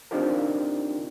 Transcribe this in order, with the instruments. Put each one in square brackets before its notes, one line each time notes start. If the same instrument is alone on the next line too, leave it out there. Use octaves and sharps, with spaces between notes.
[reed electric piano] C4 D4 D#4 F4 G4 A#4